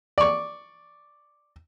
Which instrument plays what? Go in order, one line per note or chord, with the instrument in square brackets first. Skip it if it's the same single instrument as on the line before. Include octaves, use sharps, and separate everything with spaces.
[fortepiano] D5 C#6